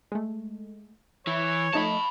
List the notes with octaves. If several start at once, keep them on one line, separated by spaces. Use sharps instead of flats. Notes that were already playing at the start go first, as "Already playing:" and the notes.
G#3 A3
E3 E4 C#5
F3 A3 D#4 A5 B5